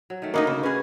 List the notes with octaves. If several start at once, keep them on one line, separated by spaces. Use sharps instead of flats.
F#3
D#3 A3
A#3 C#4 D#4 F#4 A#4 D#5 F#5
C#3
C#4 G#4 B4